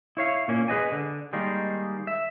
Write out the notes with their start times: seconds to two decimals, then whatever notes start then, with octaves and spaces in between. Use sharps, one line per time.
0.17 E4 C#5 F5
0.48 A#2 A#3 C#4
0.68 G#4 B4 D#5 G#5
0.92 D3
1.33 D#3 G3 G#3 A#3
2.07 E5